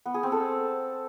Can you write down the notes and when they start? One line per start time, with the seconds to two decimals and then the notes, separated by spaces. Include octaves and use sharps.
0.05 B3
0.14 G#4
0.23 C4
0.32 A4